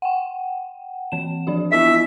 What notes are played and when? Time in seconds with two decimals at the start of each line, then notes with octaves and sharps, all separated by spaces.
0.02 F#5 G5
1.12 E3 C4 E7
1.47 F3 D4 F#4
1.72 B3 E4 D#5 E5